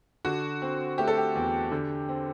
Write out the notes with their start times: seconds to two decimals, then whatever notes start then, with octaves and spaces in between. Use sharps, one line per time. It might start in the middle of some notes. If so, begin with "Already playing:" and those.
0.25 D3 F#4
0.62 C4
0.98 A3 G4
1.07 A4
1.17 G4
1.35 E2
1.72 D3
2.09 C4